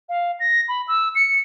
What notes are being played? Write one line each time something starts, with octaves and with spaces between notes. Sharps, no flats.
F5
A#6
B5
E6
C#7